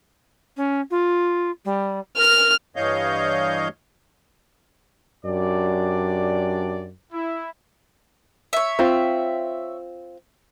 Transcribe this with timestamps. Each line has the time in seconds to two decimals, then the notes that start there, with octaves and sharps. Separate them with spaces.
0.57 C#4
0.90 F4
1.65 G3
2.17 A#4 F6
2.76 G2 E3 C#5 D#5 F5 G6
5.25 F#2 D4 G4 D5
7.13 E4
8.53 C#5 E5
8.79 C4 F4